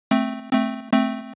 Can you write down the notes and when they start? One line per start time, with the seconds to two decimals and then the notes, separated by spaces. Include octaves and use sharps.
0.11 A3 C4
0.52 A3 C4
0.92 A3 C4